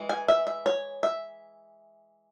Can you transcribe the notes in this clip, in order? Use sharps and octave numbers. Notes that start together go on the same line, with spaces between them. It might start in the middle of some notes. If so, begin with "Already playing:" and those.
Already playing: E3 G#3
G#5
E5
E5
C#5
E5